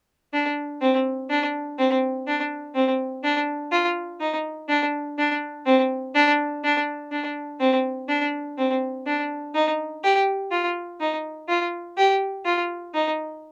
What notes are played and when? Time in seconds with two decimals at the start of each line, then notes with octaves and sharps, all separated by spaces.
0.34 D4
0.81 C4
1.30 D4
1.79 C4
2.27 D4
2.75 C4
3.24 D4
3.72 F4
4.21 D#4
4.69 D4
5.19 D4
5.66 C4
6.15 D4
6.64 D4
7.12 D4
7.60 C4
8.09 D4
8.58 C4
9.06 D4
9.55 D#4
10.04 G4
10.51 F4
11.00 D#4
11.49 F4
11.97 G4
12.45 F4
12.95 D#4